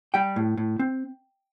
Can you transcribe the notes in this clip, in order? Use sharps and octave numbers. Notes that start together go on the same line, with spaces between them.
G3 G5
A2
A2
C4